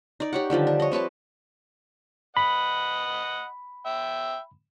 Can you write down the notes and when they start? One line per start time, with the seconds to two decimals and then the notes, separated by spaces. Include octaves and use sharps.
0.20 D#4 D5
0.33 G4 C#5 F#5
0.50 D3 D#3 F3 G3
0.67 D4
0.80 C#5 D#5
0.91 C4 B4 C#5 A5
2.37 D#5 F#5 B5
3.86 E5 G5